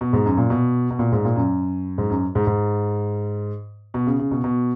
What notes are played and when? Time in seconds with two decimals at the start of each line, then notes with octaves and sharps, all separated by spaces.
0.01 B2
0.13 G#2
0.26 F#2
0.37 A#2
0.50 B2
0.90 B2
0.99 A#2
1.12 G#2
1.25 A#2
1.36 F#2
1.98 G#2
2.10 F#2
2.35 G#2
2.47 G#2
3.94 B2
4.07 C#3
4.19 C#3
4.31 B2
4.44 B2